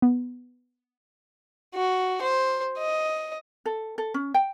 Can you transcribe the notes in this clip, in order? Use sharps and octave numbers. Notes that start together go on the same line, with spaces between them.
B3
F#4
C5
D#5
A4
A4
C#4
G5